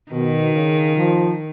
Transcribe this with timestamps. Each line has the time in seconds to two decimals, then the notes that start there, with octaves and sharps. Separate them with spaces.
0.12 B2 D#3
0.54 C#3
0.96 F3